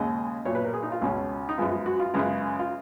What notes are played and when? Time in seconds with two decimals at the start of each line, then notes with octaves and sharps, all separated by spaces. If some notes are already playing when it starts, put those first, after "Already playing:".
Already playing: D#2 C#3 G#3 D#5
0.45 B1 A#2 F#3 C#5
0.55 B4
0.65 A#4
0.73 G#4
0.83 D#4
0.92 F4
1.02 C#2 B2 G#3 C#4
1.49 D#4
1.58 F#2 F3 G#3 B3 F4
1.71 F4
1.86 F#4
2.00 F4
2.13 F#2 C#3 G#3 B3 F4
2.59 F4